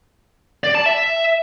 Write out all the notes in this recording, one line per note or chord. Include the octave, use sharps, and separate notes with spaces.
D5
A5
E5